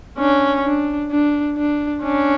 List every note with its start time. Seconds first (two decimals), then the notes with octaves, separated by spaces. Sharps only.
0.19 C#4 D4
0.65 D4
1.11 D4
1.57 D4
2.03 C#4 D4